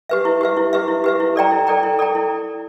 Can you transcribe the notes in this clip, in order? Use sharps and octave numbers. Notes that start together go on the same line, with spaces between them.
G4 B4 E5
E4
G4 B4 E5
E4
G4 B4 E5
E4
G4 B4 E5
E4
A4 D5 G5 A#5
E4
A4 D5 G5 A#5
E4
A4 D5 G5 A#5
E4